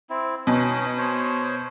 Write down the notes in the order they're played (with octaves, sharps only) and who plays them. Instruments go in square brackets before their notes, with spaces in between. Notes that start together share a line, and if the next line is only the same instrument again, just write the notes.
[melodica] C4 E4
[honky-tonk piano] B2 [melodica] C#4 D#4
[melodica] C5 C#5